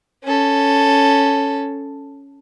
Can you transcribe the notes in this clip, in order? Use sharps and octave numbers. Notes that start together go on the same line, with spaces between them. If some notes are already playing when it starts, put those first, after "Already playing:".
C#4 A4